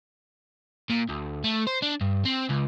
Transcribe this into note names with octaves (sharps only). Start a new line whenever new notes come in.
A#2
D2
A3
C5
D4
G2
C4
C#2